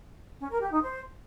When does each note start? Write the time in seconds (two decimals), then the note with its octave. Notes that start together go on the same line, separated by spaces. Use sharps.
0.40 C#4
0.50 A#4
0.61 G4
0.71 D#4
0.82 C5